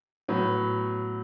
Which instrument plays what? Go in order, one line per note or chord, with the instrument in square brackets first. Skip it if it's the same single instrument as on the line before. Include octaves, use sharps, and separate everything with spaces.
[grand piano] A2 F#3 B3